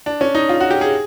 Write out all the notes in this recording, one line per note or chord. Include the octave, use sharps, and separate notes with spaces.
D4
C#4
D#4
F4
F#4
G4
G#4